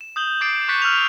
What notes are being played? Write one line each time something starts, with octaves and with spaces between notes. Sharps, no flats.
E7
D#6 G6 F#7 G7
D6 G6 A6 C7 D7
C#6 F#6 G6 A6 B6 C#7
E6 F6 G6 A6 B6 F7